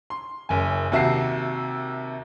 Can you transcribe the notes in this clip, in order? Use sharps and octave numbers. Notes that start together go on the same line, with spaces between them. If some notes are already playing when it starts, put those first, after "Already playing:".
C6
F#1 F#2 G#5
D#2 C3 F#4 E5 A5 C7